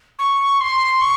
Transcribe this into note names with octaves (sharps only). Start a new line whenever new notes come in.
C#6
C6
C#6